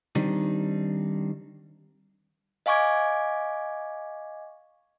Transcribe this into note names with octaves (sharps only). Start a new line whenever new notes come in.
D#3 G3 C4 D4 D#4
D#5 F5 G#5 C#6 D6 G#6